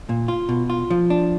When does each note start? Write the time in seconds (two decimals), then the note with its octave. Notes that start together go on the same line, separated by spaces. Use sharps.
0.09 A#2
0.28 F4
0.49 B2
0.70 F4
0.90 F3
1.10 D4